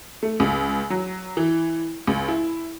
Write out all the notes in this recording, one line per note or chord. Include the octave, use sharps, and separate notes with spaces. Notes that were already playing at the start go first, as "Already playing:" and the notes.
A3
C#2
F#3
E3
C#2
E4